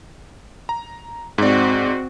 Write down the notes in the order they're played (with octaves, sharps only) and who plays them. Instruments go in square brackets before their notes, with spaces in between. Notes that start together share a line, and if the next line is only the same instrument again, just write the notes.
[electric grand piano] A#5
[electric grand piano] G#2 D5 [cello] C4 F#4